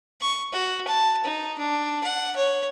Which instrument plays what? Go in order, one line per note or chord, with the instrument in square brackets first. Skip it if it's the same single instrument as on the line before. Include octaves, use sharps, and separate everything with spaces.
[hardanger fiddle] C#6
F#4
A5
D#4
D4
F#5
C#5